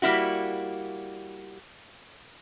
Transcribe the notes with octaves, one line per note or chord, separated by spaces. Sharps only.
G3 A#3 E4 F#4